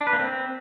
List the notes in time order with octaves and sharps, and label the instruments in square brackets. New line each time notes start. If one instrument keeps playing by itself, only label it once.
[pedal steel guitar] D4
B4
A#3
C4